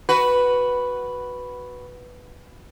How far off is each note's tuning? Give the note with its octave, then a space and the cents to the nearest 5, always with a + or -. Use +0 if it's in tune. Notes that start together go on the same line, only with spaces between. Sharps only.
F#4 +5 B4 +0